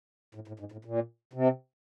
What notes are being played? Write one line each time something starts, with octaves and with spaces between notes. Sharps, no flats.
A2
A2
G#2
A2
A#2
C3